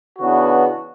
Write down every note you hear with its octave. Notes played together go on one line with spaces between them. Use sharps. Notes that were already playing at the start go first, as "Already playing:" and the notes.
C#3 E3 B3 D4 F#4